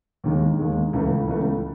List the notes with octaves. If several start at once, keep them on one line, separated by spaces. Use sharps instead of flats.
D#2 D#3 G#3
D#2 D#3 G#3
C#2 C#3 E3 A3
C#2 C#3 E3 A3